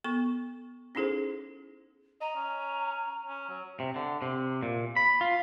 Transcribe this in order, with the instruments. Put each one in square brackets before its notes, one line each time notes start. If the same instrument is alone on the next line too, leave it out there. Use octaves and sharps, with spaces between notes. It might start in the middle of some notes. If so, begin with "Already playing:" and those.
[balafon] B3 A4 C#6
C#4 D#4 E4 G#4 A4 C5
[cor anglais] D#5 [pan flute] A#5
[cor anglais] C#4
C#4
F#3
[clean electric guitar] C3
D3
C3
A#2
B5
F4